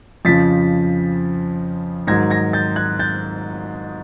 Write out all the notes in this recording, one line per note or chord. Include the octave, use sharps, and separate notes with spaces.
F2 C#3 F3 A6 B6
G#2 D#3 F#3 G#6 A#6
G#6 A#6
G6 A6
F#6 G#6
G6 A6